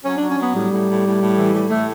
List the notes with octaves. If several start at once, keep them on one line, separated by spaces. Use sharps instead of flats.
F#3 C#4
F#3 D4
C#4
F#3 B3
A2 G3
A2
A2
A2
A2
E3
A2 G3
A2 A3